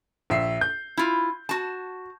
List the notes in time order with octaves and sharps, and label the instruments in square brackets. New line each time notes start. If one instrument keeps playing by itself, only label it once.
[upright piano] A#1 E5 C7
G6
[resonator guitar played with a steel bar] E4 F4
F#4 A5